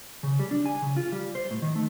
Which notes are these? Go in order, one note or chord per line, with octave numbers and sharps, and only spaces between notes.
C#3
G3
D4
G#5
C#3
F4
G3
C5
A2
D#3
A3